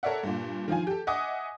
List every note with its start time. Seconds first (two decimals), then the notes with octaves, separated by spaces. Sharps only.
0.03 A4 A#4 C#5 D5 E5 F#5
0.23 G2 A#2
0.68 D#3 F3 F4 G#5
0.87 G4 A4
1.07 D#5 E5 F#5 G#5 D6 D#6